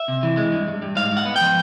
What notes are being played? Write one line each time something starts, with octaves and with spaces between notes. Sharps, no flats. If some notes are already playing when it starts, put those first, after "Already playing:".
Already playing: E5
C3
E3
G#3
G2
G2
G2
G#2 F5
G#2
F#5
B3
G5
F3